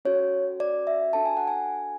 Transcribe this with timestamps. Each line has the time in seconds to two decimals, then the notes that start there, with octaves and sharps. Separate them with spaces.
0.05 C#4 F#4 A4 C#5
0.60 D5
0.87 E5
1.13 D4 F#4 A4 A5
1.25 G#5
1.37 F#5
1.47 G#5